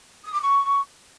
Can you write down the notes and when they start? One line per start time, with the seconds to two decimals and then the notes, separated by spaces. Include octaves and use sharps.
0.23 D#6
0.33 D6
0.42 C#6